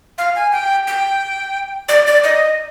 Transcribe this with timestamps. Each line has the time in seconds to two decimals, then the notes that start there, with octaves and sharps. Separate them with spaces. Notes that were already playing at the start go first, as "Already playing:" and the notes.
0.18 F5
0.36 G#5
0.52 G5
0.87 G5
1.89 D5
2.07 D5
2.24 D#5